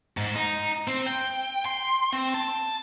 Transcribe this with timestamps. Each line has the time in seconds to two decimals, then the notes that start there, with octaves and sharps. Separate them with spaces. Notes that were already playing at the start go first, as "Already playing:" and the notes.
0.17 G#2
0.35 D#4
0.88 C4
1.06 G5
1.65 C6
2.13 C4
2.34 A5